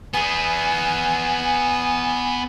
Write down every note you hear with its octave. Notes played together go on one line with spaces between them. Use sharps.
B3 G#4 G#5